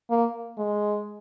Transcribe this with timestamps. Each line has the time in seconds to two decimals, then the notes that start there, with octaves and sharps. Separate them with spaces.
0.10 A#3
0.58 G#3